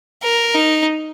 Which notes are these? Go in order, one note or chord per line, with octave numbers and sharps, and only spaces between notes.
A#4
D#4